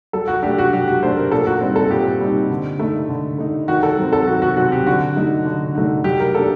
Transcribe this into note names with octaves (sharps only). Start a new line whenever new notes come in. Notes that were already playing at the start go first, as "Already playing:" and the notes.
F#3 A4
F#4
A3 D4 G4
F#4
F#3 G4
F#4
A3 D4 C5
A#4
A#2 A4
F#4
G3 C4 D#4
A4
A#2 G4
G3 C4 D#4
D3
A3 D#4
D3
A3 D#4
D#3 F#4
A4
F#3 C4
A4
D#3 F#4
F#4
F#3 C4 F#4
G4
D3 F#4
F#3 A3 D#4
D3
F#3 A3 D#4
F#3 G4
A#4
A#3 D4 A4